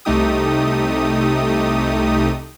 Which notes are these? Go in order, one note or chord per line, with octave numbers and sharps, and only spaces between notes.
C2 C3 A3 D#4 G4 D#6